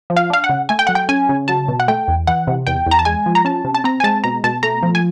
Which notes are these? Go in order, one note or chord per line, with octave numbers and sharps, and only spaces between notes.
F3
F5
D4 F5
F#5
C#3
A3 G#5
G5
F#3 F#5
G5
C#4 G#5
C#3
F#3 A5
B2
F#5
A3 G5
E2
E3 F#5
C3
E2 G5
E2
A#5
A5
G#3 G#5
F3
A#5
C#4 A5
C3
A5
C4 A#5
G#5
G#3 A5
B2 A#5
B2 A5
A3 A#5
F3
G#5